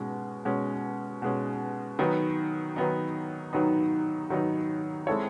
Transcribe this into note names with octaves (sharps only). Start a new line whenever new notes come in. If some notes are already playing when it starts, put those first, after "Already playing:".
Already playing: B2 G#3 C#4
B2 G#3 C#4
B2 G#3 C#4
D#3 F#3 B3 D#4
D#3 F#3 B3 D#4
D#3 F#3 B3 D#4
D#3 F#3 B3 D#4
G#3 C4 E4 A4 C#5